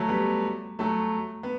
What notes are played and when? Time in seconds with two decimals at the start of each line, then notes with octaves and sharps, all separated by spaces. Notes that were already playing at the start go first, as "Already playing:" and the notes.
Already playing: F#3 A3
0.08 G3 B3
0.79 F#3 A3
1.43 B3